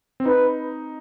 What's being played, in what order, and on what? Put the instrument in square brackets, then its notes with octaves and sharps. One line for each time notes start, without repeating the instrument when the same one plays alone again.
[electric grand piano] C4
[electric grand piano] D#4 [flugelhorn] B4